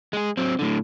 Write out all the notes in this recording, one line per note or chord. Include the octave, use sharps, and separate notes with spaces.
G#3 G#4
F#3 C4
A2 D3